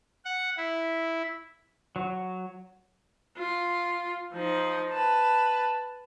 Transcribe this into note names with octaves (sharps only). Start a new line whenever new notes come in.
F#5
E4
F#3
F4
F3 D#4
B4 A5